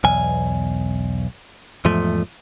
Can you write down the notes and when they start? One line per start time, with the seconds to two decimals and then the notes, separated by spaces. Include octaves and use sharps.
0.04 B1 E2 G#5
1.85 E2 G#2 F3 A3